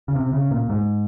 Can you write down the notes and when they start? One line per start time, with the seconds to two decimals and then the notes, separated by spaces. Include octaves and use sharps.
0.08 C#3
0.15 C3
0.33 C#3
0.51 A#2
0.70 G#2